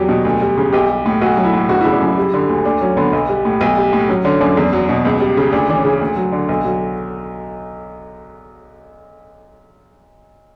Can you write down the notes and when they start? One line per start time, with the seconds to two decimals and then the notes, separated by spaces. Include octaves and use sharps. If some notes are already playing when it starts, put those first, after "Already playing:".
Already playing: E2 F#3 G4
0.09 B2
0.25 D2
0.41 G3
0.58 C#3
0.73 B1 G4
0.89 G3
1.06 A2
1.22 B1 F#4
1.37 F#3
1.45 E4
1.53 A2
1.69 G1 F#4
1.81 C#3 E4
1.93 D4
2.00 F#2 E4
2.17 G3
2.34 D3
2.49 D2
2.65 D2 D4
2.81 F#3 C#4
2.97 D3 B3
3.13 B1
3.29 G3
3.45 A2
3.61 B1
3.77 G3
3.93 A2
4.09 F#3 C#4
4.25 D3 C#4
4.41 F#2 D4
4.57 E2
4.73 F#3
4.89 B2
5.05 C#2
5.20 G3
5.37 C#3
5.52 D2 D4
5.69 E3 D4
5.77 C#4
5.85 C#3
6.01 D2
6.16 F#3
6.32 D3
6.49 B1
6.65 F#3